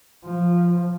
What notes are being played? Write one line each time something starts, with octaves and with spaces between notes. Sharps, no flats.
F3